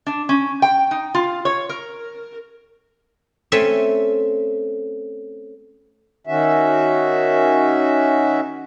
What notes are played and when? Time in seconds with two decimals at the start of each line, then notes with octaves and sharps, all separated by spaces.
0.06 D4
0.29 C#4
0.62 G5
0.91 D#4
1.15 F4
1.45 C#5
1.69 A#4
3.52 A3 C4 C#4 E5 G#5
6.27 D#3 C#4 F#4 E5